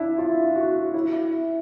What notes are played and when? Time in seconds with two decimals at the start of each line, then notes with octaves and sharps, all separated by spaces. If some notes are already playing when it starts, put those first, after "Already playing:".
Already playing: D4 E4
0.18 F4
0.56 F#4
0.94 E4